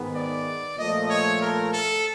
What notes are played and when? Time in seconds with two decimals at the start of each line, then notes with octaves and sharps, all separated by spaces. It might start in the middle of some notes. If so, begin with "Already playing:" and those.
Already playing: G#2 D#3 G#3 B3
0.14 D5
0.77 A#2 F3 A3 D#5
1.09 C#5
1.40 A#4
1.72 A4